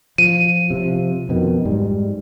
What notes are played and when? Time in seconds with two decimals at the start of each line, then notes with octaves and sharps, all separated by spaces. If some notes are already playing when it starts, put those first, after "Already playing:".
0.18 F3 D#7
0.70 C3 F3
1.29 F2 B2 D#3
1.65 G#2 G3